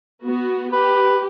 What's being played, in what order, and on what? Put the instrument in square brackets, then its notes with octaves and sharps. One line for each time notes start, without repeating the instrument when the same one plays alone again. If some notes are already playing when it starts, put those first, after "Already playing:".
[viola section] B3 F#4
[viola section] G4 [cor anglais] B4